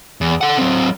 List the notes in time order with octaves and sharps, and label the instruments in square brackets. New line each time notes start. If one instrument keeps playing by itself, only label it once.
[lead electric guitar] E2
A4 F#5
F#3 C4